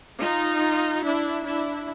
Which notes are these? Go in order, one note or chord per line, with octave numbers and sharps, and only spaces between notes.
D#4 F4
D4 E4
D4 E4